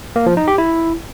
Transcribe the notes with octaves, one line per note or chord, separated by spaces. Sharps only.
A#3
F3
D#4
G4
E4